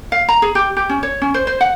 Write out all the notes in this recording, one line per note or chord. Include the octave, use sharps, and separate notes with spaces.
F5
A#5
G#4
G4
G4
C#4
C#5
C#4
C5
C5
F#5